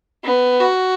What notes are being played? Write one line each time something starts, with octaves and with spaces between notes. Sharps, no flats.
B3
F#4